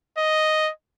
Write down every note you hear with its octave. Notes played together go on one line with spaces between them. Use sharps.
D#5